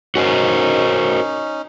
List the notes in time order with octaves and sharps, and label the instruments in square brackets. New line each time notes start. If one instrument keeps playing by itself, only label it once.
[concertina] C#4 D#4 [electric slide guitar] F#4 A#4 C5